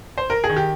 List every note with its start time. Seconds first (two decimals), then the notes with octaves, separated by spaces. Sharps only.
0.18 C5
0.30 A#4
0.44 G#4
0.49 D#3
0.56 G4